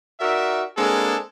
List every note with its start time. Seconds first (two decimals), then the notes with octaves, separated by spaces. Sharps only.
0.21 D#4 F#4 A#4 D5 E5
0.77 G#3 A#3 C4 D4 G#4 A4